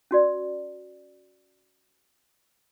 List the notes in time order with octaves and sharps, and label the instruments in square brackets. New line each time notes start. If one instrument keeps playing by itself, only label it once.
[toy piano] C#4 F#4 D5